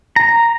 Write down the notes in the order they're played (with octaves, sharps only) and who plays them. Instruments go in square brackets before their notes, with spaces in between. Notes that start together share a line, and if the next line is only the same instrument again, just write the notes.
[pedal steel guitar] A#5